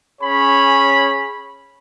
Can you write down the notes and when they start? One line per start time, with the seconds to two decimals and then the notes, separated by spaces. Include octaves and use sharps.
0.22 C#4 G#4 C#5 B5